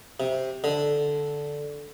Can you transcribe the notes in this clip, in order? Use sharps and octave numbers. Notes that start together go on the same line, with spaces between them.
C3
D3